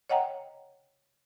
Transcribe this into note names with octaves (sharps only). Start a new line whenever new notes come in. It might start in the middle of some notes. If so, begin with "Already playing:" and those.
C#5 D#5 F#5 G5 A#5